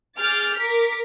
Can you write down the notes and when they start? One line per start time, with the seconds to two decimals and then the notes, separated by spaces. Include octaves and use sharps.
0.17 G#4 D6 F6 G6 A6
0.57 A#4 D6 B6